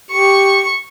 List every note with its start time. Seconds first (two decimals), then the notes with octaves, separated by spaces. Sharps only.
0.11 G4 C#6